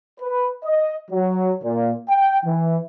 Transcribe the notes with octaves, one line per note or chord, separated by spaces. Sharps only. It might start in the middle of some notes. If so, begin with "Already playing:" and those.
B4
D#5
F#3
A#2
G5
E3